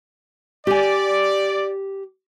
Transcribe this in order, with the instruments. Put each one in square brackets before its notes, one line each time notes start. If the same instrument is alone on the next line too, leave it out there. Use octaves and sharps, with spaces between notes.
[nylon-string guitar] G4 G#5 [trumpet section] D5